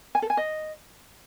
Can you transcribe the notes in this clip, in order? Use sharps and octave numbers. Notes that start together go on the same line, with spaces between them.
G#5
A4
G#5
D#5